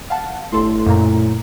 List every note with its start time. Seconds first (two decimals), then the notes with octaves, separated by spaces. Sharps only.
0.10 F5 F#5 A5
0.52 G1 A2 A4 C6
0.86 F#2 A#2 A#5